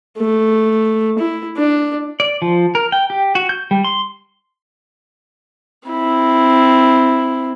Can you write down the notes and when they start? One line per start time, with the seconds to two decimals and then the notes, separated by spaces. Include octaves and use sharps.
0.18 A3
1.19 E4
1.57 D4
2.20 D5
2.42 F3
2.75 A#4
2.92 G5
3.10 G4
3.35 F#4
3.49 G6
3.71 G3
3.84 C6
5.89 C4 E4